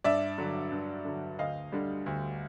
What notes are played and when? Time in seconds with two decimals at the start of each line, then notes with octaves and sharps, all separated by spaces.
0.04 G2 D5 E5
0.38 D3 F#3
0.72 G2
1.05 D3 F#3
1.39 D2 D#5 F5
1.72 D3 G3
2.06 D2